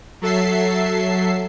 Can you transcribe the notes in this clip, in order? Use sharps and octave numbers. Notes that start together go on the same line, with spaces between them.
F#3 A4 E5 C7